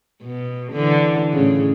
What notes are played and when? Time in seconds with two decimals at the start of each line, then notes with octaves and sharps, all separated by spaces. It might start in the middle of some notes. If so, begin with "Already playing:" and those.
0.23 B2
0.73 D3 E3
1.33 A2 C#3